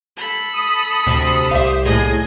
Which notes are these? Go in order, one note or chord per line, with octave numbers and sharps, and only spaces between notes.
A4 B5
D#6
D2 C3
C2 G4 C5 E5 F5
D#2 A2 G#4 D#5 G#5